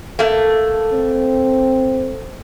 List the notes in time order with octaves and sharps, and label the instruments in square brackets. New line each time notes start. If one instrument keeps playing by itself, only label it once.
[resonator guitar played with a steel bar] A3 A#3
[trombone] C4